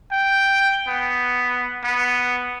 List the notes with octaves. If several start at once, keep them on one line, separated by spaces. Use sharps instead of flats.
G5
B3
B3